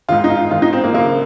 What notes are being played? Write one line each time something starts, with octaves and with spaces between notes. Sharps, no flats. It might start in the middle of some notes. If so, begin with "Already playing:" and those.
G#2 D#3 F4
D#4
F4
G#2 D#3 F4
D#4
C4
A#3
F#2 C#3 A#3